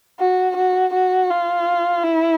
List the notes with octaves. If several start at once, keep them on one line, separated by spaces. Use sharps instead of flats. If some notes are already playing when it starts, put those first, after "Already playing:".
F#4
F#4
F#4
F4
E4